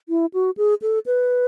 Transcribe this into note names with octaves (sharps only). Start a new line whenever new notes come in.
E4
F#4
G#4
A4
B4